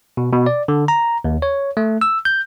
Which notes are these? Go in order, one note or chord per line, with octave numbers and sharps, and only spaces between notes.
B2
B2
D5
D3
A#5
D#2
C#5
A3
E6
G6